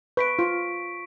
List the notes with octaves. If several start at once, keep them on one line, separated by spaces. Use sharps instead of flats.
B4 C#6 B6 D7
F4